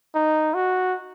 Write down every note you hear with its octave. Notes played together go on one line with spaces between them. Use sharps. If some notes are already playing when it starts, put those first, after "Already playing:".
D#4
F#4